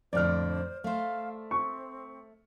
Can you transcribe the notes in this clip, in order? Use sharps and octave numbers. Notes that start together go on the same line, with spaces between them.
F2 A2 D3 C5 D5 F6
A3 C5 F5
C4 C#6